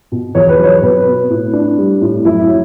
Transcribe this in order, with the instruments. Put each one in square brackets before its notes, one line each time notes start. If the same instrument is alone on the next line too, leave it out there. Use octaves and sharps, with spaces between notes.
[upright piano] B2
E2 C#5
B4
F#3
C#5
B2 B4
B3
A2
D4
G3
A2
F#2 E4
F#3